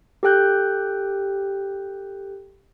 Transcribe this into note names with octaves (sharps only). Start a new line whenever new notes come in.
G4 A4 G5 F#6 G6